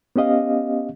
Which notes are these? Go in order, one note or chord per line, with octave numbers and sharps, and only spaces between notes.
B3 C#4 G4 D#5 F5